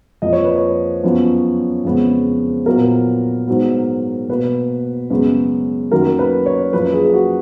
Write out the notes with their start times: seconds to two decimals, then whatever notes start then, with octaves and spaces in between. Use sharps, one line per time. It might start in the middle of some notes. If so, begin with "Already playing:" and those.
0.22 F2 F3 A#3 D#5
0.33 C#5
0.44 B4
0.56 C#5
1.04 F#2 F3 B3
1.85 F2 C#3 G#3 B3
2.66 A#2 F#3 B3 A#4
3.47 G#2 F#3 B3
4.29 B2 A#3 B4
5.10 F#2 C#3 G#3 B3
5.92 F#2 D#3 F#3 A#3 A#4
6.19 B4
6.46 C#5
6.73 F#2 F3 A#3 B4
6.93 G#4
7.05 G#4
7.14 F#4